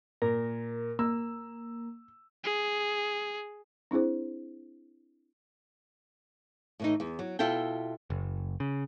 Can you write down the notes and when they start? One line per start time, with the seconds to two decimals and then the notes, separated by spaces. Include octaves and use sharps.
0.22 A#2 A#4
0.99 A#3 E6
2.44 G#4
3.91 C4 D4 E4 G#4 C5
6.80 A2 E3 D#4
7.00 E2
7.19 F#3
7.39 B2 E4 F4 A4 G5
8.10 F#1
8.60 C#3